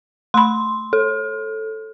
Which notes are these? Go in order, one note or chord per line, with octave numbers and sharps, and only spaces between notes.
A3 B5 C6
A4